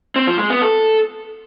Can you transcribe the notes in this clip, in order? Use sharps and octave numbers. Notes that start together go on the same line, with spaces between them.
C4
F3
G#3
B3
A4